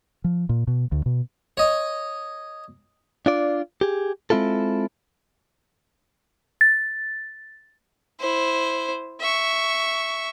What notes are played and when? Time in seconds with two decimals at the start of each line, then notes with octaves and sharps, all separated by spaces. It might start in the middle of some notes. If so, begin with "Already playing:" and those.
0.24 F3
0.49 A#2
0.67 B2
0.92 D2
1.06 B2
1.57 C#5 D#5
3.26 D4 F4 D5
3.81 G4 G#4
4.30 G#3 C4 E4 F4 A4
6.61 A6
8.20 E4 C5
9.21 E5 C#6